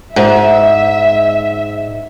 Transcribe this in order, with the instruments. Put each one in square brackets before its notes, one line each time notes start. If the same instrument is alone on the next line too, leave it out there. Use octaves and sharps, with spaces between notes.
[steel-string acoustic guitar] G#2 [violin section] E5